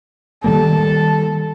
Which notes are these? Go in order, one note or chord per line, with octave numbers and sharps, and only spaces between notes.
D#3 G3 A#3 A4